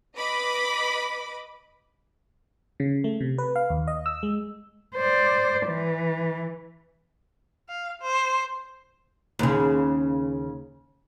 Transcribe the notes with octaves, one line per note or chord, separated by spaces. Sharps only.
B4 D#5 B5 D6
C#3
A3
C3
B4
F5
D#2
D#5
E6
G#3
C5 D5
E3
F5
C5
D#2 C#3